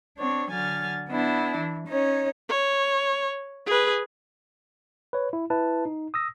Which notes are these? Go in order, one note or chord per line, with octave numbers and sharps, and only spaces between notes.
C4 D4 C#5
D3 F#3 G#5 F6 A6
B3 D4 E4
E3
C#4 D#4 C#5
C#5
G#4 B4
B4 C#5
E4
E4 B4 A5
D#4
D#6 E6 A#6